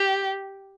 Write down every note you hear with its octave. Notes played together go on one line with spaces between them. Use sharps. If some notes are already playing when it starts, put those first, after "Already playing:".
Already playing: G4